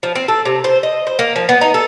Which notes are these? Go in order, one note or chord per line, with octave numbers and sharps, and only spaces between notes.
F3
C4
A4
C3
C5
D#5
C5
A#3
F3
B3
D#4
A4